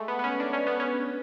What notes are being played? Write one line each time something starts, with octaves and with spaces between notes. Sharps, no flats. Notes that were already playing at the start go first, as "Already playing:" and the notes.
Already playing: G#3 A3
B3
B3
C#4
D4
C#4
B3
C#4